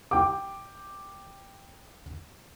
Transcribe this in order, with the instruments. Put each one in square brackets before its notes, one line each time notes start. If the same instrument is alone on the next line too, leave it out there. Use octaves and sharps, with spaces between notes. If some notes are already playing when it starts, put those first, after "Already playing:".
[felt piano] G5 D6